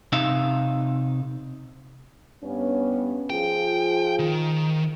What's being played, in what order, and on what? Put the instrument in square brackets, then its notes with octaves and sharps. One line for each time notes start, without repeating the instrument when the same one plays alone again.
[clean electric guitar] C3 D#4 E5 F5
[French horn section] G2 B3 C#4
[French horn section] F3 F4 G#4 [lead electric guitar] G5
[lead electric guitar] D#3